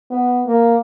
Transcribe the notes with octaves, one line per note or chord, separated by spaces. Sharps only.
B3
A#3